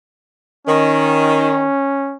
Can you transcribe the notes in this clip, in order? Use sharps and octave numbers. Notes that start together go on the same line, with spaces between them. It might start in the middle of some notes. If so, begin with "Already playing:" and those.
D#3 C#4